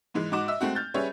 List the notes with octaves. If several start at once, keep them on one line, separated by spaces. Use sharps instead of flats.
G#2 E3 G#3
G#2 D#4 F#4 D6 E7
D#5 E5 E6
G#3 A3 C4 F#4
F6 G6 A6
G3 C#4 G#4 B4 C#5 E5